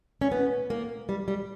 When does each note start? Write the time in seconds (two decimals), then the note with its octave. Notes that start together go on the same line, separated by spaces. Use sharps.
0.21 C#4
0.32 B3
0.70 A#3
1.09 G3
1.28 G3